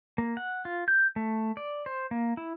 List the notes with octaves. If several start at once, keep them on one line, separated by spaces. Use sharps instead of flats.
A#3
F#5
F4
G6
A3
D5
C5
A#3
E4